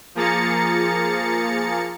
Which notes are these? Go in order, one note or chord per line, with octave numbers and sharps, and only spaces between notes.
F3 A#3 G#4 A#5 A6 C#7